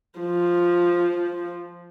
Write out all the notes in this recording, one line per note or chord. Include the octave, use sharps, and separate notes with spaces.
F3